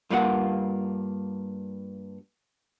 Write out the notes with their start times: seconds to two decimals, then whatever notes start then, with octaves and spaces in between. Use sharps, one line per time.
0.10 G2 A#3 F4 B4 F#5